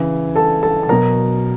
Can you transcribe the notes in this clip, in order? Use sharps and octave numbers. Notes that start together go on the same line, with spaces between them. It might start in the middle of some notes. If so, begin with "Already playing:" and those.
Already playing: C#3 E3
A4 A5
A4 A5
A5
B2 F#3 A#4 A#5